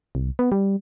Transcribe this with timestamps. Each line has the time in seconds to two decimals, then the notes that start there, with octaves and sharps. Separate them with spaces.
0.15 C2
0.39 B3
0.52 G3